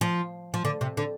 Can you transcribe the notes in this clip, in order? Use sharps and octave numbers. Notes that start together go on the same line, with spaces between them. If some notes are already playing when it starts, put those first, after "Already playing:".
F3
F3
D3
C3
D3